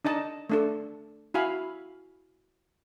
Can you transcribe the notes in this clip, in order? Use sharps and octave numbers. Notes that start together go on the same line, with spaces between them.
D4 D#4 D#5 A5
A3 D4 A4
E4 F#4 F5 G#5 B5